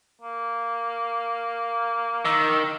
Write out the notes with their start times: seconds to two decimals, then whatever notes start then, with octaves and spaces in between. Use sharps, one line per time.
0.21 A#3
2.25 D#3 E6